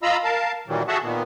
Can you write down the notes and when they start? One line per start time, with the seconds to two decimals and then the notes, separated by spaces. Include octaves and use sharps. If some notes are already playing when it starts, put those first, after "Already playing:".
0.03 F4 D#5 F5 A#5 B5 E6
0.24 A#4 F5 A5
0.68 A#2 D#3 E3 F#3 G3
0.88 F#4 G#4 A4 E5 F#5 A5
1.03 A#2 D#3 B3